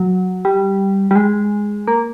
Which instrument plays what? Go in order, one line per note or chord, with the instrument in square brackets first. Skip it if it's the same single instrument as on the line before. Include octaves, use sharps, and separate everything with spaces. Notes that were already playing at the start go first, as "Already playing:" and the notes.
Already playing: [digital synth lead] F#3
G3
G3
G#3
A#3